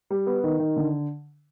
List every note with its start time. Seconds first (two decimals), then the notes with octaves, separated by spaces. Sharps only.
0.10 G3
0.26 B3
0.44 D#3
0.59 D#3
0.76 D3